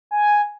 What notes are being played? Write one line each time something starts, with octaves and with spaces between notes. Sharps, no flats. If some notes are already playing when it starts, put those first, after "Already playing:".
G#5